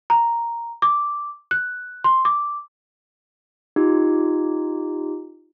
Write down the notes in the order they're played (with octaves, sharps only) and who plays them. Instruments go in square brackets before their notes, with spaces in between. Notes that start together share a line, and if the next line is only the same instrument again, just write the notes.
[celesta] A#5
D6
F#6
C6
D6
[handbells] D#4 F4 G4